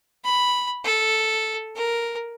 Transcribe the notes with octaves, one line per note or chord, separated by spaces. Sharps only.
B5
A4
A#4